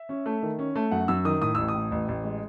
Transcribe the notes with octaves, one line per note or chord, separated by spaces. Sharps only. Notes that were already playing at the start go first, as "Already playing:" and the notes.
Already playing: E5
C#4
A3
D#3
C#4
A3
F#2 F#5
F#2 E6
D#3 D#6
A2 D#6
A1 E6
D#6
A2
A1
A1
G#3